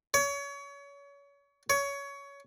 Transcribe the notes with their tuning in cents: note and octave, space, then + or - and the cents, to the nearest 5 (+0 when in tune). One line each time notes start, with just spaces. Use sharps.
C#5 +30
C#5 +20